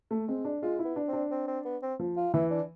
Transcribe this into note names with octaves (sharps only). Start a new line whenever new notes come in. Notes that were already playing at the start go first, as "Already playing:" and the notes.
A3
G#3 C4
D4
G#3 F4
E4
B3
D4
C4
D4
C4
C4
B3
C4
F3
F4
E3 E4
D4